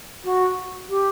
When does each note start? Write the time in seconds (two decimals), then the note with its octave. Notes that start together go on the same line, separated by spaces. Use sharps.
0.24 F#4
0.88 G4